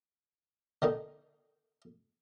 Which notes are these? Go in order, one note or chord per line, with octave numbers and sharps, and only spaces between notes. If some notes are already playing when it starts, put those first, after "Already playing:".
D3 D#3 D#4